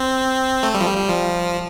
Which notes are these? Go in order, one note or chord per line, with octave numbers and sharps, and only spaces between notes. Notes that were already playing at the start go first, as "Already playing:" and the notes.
Already playing: C4
A3
G3
F3
G3
G3
F3